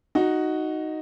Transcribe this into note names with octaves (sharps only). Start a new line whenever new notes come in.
D#4 F#4